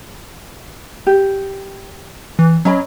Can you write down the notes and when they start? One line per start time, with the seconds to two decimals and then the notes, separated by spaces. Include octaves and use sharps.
1.07 G4
2.39 E3
2.65 F#3 C#4 D#5 B5